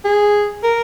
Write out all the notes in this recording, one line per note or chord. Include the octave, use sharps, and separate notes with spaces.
G#4
A#4